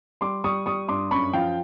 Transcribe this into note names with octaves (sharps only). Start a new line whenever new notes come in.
G3 C6 D6
G3 C#6 D#6
G3 C#6 D#6
G2 C6 D6
F#2 B5 C#6
F3 F5 G5